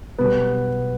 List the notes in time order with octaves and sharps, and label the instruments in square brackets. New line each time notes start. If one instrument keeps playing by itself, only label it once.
[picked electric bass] B1 B2 G3 [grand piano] B3